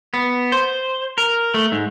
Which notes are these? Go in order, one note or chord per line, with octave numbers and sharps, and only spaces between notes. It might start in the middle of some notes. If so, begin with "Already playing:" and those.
B3
C5
A#4
A3
G#2